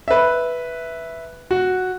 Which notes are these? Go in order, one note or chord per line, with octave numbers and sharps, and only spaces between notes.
B4 E5
F#4